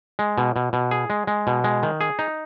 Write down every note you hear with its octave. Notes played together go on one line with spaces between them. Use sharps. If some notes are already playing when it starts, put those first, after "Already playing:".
G#3
B2
B2
B2
G#4
G#3
G#3
B2
G#3
D#3
G#4
D#4